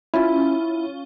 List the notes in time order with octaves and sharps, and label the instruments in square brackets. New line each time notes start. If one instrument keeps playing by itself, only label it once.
[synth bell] C#4 F4 [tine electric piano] E4